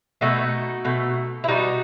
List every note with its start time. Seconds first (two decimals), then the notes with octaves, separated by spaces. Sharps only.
0.21 B2 A3 D#4 F#4
0.85 B2 A3
1.44 E4
1.48 B2 G3 D#4 F#4